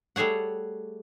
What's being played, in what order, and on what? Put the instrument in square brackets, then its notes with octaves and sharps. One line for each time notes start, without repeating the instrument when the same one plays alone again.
[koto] G3 A3 G#4 C#5 F#5